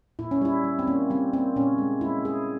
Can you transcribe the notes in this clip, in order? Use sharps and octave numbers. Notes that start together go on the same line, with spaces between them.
A#2 E4
C#4
G3 E4
G3
C4
A#3 C#4
G3 C4
A#3 C4
A#2 C#4
G#3
G#3 E4
G#3 G#4